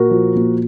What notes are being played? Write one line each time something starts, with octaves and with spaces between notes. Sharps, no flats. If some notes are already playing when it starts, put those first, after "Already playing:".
Already playing: A#2 F#4 A#4
F3
A#2